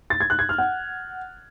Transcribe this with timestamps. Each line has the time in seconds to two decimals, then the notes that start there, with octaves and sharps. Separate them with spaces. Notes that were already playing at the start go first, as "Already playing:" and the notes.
0.10 A6
0.20 G#6
0.30 F#6
0.39 G#6
0.49 F6
0.58 F#5